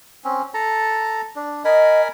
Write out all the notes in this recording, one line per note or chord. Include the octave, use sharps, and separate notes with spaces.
C4 C#4
A4 A5 A#5
D4
A#4 D#5 G#5 B5